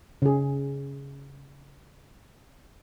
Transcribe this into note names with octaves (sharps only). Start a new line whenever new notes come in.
C#3 G#4